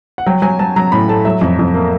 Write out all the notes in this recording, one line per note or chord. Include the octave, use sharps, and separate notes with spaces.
F#5
F#3 G5
F#3 G#5
F#3 A5
F#3 A#5
A2 B5
A3 A5
F#3 E5
F2
F2
A#3